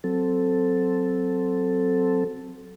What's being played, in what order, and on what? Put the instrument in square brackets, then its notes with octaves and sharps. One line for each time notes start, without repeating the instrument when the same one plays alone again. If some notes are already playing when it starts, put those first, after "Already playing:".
[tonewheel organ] F#3 C4 A4